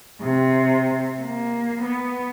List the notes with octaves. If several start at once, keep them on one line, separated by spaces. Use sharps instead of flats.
C3
A#3
B3